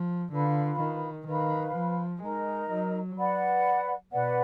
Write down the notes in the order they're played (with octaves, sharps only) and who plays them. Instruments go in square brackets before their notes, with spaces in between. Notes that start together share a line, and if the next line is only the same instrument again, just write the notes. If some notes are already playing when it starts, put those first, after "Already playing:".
Already playing: [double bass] F3
[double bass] D3 [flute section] F4 B4 F5 B5
[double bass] D#3
[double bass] D#3 [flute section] B4 F5 B5
[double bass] F3
[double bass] G#3 [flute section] D#4 A#4 D#5 A#5
[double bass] F#3
[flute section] B4 D5 F#5 B5
[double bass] B2 [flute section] B4 D5 F#5